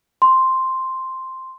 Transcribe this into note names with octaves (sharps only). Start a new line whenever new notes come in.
C6